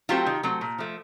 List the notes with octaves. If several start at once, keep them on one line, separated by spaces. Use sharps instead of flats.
F#3 A3 C4 F4 G4
D#3
F#3 A3 C4
A#2
F3 A3